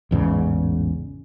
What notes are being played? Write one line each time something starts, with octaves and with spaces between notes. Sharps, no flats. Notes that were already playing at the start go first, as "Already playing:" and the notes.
A1 E2 G#2 C#3